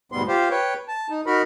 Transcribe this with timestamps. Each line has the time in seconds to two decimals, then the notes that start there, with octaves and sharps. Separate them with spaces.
0.12 D2 G#2 B2 G3 B3 C6
0.28 F4 G4 C5 F5
0.50 B4 C#5 G5
0.88 A5
1.10 D#4
1.26 D#4 F#4 A#4 B5